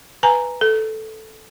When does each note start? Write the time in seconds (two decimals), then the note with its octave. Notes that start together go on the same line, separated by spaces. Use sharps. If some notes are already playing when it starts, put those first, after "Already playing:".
0.23 B4 G#5 A#5
0.61 A4